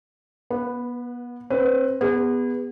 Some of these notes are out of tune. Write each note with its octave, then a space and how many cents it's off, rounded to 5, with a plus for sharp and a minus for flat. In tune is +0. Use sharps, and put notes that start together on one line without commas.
B3 -30 B4 +0
C4 +30 B4 +15
B3 +0 G#4 -35